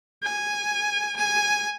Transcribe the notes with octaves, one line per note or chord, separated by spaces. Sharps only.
G#5
G#5